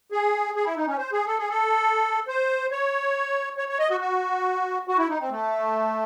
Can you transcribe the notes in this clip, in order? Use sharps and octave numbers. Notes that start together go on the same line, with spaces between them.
G#4
G#4
E4
D#4
C#4
C5
G#4
A4
G#4
A4
C5
C#5
C#5
C#5
D#5
F#4
F#4
F#4
E4
D#4
C4
A3